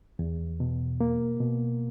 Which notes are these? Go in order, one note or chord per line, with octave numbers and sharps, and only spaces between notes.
E2
B2
A#3
B2